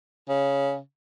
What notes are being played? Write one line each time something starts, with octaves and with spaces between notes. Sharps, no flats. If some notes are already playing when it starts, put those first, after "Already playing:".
C#3